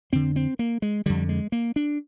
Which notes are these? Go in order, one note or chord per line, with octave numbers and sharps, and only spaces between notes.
F2 D3 C4
C4
A#3
G#3
F2 D3 G3
G#3
A#3
D4